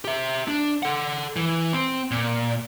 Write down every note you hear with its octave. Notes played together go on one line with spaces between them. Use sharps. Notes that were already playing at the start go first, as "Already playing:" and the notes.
G4 E5
D4
A4 F#5
E3
C4
A#2